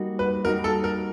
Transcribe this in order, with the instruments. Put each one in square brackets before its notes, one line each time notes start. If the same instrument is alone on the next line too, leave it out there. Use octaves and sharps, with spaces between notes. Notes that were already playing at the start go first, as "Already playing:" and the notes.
Already playing: [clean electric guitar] G3 A#3 D#4 F#4
[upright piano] B4
[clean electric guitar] G3 A#3 D#4 F#4 [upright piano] A#4
[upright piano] A4
A#4